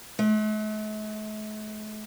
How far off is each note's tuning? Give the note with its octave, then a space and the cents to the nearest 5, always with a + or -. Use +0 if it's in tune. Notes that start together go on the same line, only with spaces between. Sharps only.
A3 -45